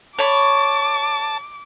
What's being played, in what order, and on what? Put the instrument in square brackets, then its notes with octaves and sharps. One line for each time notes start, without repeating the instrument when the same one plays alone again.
[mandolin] C#5 B5 [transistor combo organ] A5 [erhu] D6